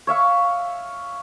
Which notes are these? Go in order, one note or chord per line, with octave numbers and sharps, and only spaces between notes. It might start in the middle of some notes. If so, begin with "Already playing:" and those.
C#5 E5 F5 C#6